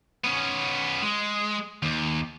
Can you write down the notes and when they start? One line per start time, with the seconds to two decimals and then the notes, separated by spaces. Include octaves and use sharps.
0.24 B3 C#4
1.03 G#3
1.83 D#2